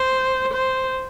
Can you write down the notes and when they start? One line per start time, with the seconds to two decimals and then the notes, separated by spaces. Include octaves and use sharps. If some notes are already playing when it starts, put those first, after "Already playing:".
Already playing: C5
0.54 C5